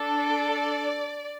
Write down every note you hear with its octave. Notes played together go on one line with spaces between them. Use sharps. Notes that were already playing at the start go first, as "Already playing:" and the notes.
Already playing: D4 A4
D5